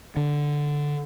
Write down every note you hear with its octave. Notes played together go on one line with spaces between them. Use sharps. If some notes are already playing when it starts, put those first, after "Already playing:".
D3